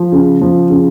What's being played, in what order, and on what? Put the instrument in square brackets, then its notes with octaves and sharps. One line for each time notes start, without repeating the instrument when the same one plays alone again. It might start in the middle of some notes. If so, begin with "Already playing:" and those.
Already playing: [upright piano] F3
C#3
F3
C#3